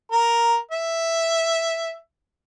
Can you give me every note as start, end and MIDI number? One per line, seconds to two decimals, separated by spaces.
0.12 0.56 70
0.72 1.95 76